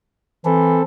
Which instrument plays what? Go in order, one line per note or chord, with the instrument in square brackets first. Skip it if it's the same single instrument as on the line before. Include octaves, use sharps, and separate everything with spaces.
[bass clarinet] E3 [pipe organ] C4 A4